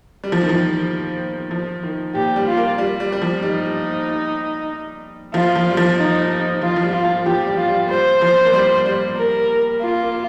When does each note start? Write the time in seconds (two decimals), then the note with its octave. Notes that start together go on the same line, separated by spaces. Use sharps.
0.24 G3
0.32 F3
0.41 D#3
0.49 F3
1.51 F3
1.83 D#3
2.14 A#2 G4
2.36 G3
2.47 F4
2.57 A#3
2.78 G3
3.00 G3
3.12 G3
3.22 F3
3.42 G3 D#4
5.34 F3 F4
5.55 F3
5.70 G3
5.77 F3
5.97 D#4
6.61 F3 F4
6.76 F3
6.83 G3
6.93 F4
7.04 F3
7.25 F3 G4
7.47 G3
7.58 F4
7.68 G3
7.89 G3 C5
8.21 F3
8.45 A#3
8.53 G3
8.86 G3
9.17 A#4
9.81 A#3 F4
10.03 A#3